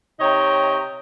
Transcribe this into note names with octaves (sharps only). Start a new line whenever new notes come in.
C3 D#4 C#5 D#5 G5 A#5